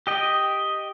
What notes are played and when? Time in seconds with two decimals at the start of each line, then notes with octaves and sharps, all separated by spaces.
0.07 G4 D#5 G5